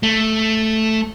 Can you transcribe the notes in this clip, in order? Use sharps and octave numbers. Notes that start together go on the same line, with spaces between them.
A3